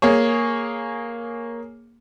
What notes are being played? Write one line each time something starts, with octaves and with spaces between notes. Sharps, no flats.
A#3 G#4 C#5